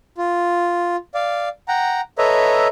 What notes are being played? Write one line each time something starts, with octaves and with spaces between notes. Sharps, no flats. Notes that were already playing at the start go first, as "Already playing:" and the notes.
F4
D5 F5
F#5 G5 A#5
A4 B4 C#5 D#5 E5 A#5